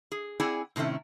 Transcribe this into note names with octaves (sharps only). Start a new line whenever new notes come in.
G#4
C4 E4 G#4 D5 F#5 G#5
A2 C3 D#3 A3 C#4